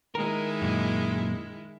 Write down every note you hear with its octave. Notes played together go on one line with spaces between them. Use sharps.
D#3 G#3 E4 A#4
F#2 A#2